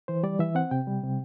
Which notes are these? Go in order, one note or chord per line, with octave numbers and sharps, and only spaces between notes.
E3 C5
G3 D5
E3 E5
C4 F#5
C3 G5
G3
C3